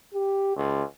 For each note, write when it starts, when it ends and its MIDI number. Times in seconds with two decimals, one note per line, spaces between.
0.14 0.56 67
0.56 0.83 37